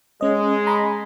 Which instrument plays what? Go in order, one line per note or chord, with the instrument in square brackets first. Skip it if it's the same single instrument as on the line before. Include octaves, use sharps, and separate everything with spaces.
[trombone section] G#3 [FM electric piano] C#4 D#5
[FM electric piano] A#5 B5